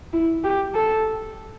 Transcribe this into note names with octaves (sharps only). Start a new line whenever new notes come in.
E4
G4
A4